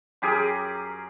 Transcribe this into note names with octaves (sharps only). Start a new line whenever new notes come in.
F#2 G4 G#4 A#4